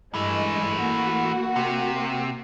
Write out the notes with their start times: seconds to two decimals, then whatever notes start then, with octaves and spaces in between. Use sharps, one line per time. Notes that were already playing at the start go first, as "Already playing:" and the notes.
0.14 G2 E3 G#3 A3
0.82 A#3 F#4
1.56 C3